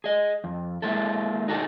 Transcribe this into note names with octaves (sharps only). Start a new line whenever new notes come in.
G#4 D#5
F2
G#3 A#3 E4 A4
D#4 F#4 G#4 A4